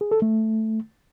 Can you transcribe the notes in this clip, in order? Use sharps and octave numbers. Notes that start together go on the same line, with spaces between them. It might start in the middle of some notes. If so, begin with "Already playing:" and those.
G#4
A4
A3